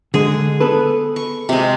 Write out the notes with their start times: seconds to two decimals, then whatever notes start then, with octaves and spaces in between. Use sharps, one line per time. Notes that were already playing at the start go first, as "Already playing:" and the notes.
0.14 D3 G#3 G#4
0.60 B3 A4 B4
1.16 C#6
1.49 C3 G#3